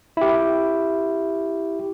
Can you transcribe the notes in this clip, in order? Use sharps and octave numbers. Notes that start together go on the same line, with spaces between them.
E4 G4